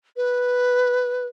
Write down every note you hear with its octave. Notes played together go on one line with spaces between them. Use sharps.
B4